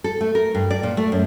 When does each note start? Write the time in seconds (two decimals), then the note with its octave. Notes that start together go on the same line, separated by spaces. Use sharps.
0.04 A4
0.21 A3
0.35 A#4
0.55 G2
0.70 D5
0.83 A#2
0.97 A3
1.12 F#2